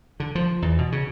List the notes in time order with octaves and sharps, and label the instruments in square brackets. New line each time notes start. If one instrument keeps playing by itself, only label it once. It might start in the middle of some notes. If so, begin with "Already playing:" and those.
[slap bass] D3
F3
E2
B2
C#3